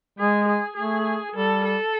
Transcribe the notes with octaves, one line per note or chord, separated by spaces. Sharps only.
G#3 G#4
G#4
A3 G#4
G3 A4
A4